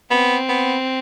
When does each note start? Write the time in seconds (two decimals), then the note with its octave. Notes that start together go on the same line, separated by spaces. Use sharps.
0.11 B3 C4
0.49 B3